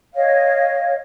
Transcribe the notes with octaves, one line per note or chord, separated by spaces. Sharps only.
C#5 D#5 F5